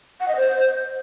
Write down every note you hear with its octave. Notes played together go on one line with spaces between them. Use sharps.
F#5
D#5
C5